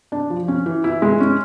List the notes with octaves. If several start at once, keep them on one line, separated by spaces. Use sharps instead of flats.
D4
F3
C#4
E3
E4
G#3
C#4